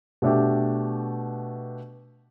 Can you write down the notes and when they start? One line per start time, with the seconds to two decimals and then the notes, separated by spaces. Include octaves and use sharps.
0.22 B2 A3 D4 G4